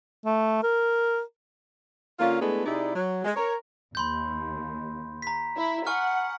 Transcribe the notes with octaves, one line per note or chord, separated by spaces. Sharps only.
A3
A#4
D3 A#3 C#4 F4
G#3 A3 B3 D4 E4 G#4
C3 D#4 E4 G#4 D5
F#3
G#3
A#4 C#5
D#2 B5 C6 G6
A#5 B6
E4
F#5 G#5 C#6 F6